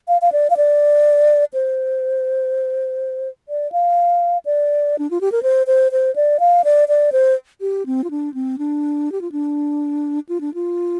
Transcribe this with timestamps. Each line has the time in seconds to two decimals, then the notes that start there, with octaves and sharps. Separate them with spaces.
0.08 F5
0.22 F5
0.32 D5
0.50 F5
0.57 D5
1.54 C5
3.49 D5
3.72 F5
4.45 D5
4.99 D4
5.11 F4
5.21 G4
5.32 A#4
5.43 C5
5.67 C5
5.92 C5
6.16 D5
6.40 F5
6.64 D5
6.88 D5
7.12 C5
7.61 G4
7.86 C4
8.04 F4
8.10 D4
8.34 C4
8.58 D4
9.12 G4
9.21 F4
9.32 D4
10.29 F4
10.41 D4
10.54 F4